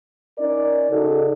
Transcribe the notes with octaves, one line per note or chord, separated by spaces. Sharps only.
C#4 D#4 A#4 D5
C#3 D#4 F#4 A4